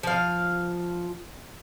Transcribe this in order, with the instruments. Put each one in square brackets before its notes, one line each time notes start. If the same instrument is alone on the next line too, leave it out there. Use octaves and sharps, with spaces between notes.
[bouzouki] F3 F5